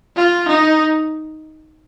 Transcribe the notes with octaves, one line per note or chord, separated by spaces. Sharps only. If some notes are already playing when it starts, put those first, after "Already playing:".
F4
D#4